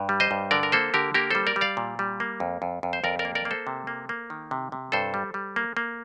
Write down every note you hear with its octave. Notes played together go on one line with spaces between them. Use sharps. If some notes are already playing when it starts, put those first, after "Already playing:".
Already playing: G2
G3
C5 D#5
G2
D3 A#4 D5
A#4
A#3 A4 C5
D3 G4 A#4
A#3 G4 A#4
G3 A4 C5
A#4 D5
G3
D5 F5
A#2
G3
A#3
F2
F2
F2
C5
F2 A#4 D5
A#4 D5
A#3
A#4 D5
A#3
A4 C5
C3
A#3
A#3
D#3
C3
C3
G2 A4 C5
G3
G3
A#3
A#3